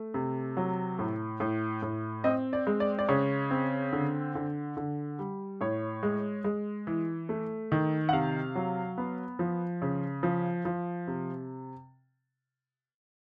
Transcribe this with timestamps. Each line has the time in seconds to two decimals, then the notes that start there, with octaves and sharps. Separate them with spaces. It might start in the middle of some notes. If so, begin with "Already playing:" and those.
Already playing: A3
0.14 C3
0.57 F#3
0.99 A2
1.40 A2
1.82 A2
2.24 C4 D#5
2.53 D5
2.67 G#3
2.80 D5
2.99 D5
3.09 C#3 C#5
3.51 C4
3.93 D3
4.35 D3
4.77 D3
5.19 G3
5.61 A2 C#5
6.03 G#3
6.44 G#3
6.87 E3
7.29 A3
7.72 D#3
8.09 F#5
8.13 C3 F5
8.55 F#3
8.98 B3
9.39 F3
9.82 C#3
10.23 F3
10.65 F3
11.07 C3